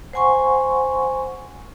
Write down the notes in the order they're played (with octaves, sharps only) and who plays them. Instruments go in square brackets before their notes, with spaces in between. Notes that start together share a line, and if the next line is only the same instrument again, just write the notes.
[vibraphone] C5 F#5 G#5 C6 C#6